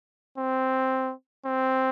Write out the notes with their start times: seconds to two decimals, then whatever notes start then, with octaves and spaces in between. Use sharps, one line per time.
0.38 C4
1.45 C4